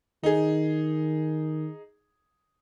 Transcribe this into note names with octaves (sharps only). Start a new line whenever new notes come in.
D#3 D#4 G#4